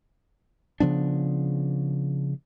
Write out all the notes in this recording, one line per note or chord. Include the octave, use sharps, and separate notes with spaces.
C#3 F3 B3 D4